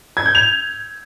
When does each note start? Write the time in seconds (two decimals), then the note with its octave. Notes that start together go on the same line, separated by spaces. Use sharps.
0.17 G#6
0.26 G6
0.35 F7